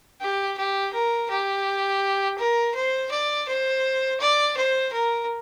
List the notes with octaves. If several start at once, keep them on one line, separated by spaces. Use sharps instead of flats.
G4
G4
A#4
G4
A#4
C5
D5
C5
D5
C5
A#4